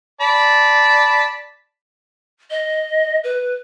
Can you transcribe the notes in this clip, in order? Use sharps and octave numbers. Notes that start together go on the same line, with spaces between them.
D5 A5 B5
D#5
B4